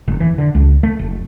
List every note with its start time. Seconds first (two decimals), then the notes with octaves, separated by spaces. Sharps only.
0.08 F1
0.20 E3
0.38 D3
0.55 C#2
0.83 A3
0.99 F1